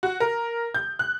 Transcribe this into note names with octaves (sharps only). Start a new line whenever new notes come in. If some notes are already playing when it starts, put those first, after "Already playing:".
F#4
A#4
G6
F#6